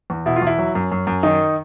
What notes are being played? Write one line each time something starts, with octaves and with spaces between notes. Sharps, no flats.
E2
B2 E4
F4
E2 E4
F#3
F#2
F#2
F#2
D#3 D#4